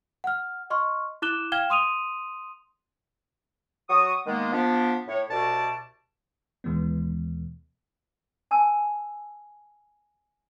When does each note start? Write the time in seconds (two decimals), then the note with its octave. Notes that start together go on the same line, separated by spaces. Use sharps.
0.24 F#5 F6
0.70 D#5 C6 C#6 F6
1.22 E4 D6 F#6 E7 G7
1.52 F5 G5 F6 G#6 E7 G7
1.70 C6 D#6 D#7 F7
3.89 F#3 C#6 D#6
4.26 D#3 G#3 A#3 B3
4.52 F3 B3 D4
5.08 A2 C#5
5.30 C2 B2 D5 A5
6.64 D#2 B2 E3 G#3 B3
8.51 G#5 A5 E6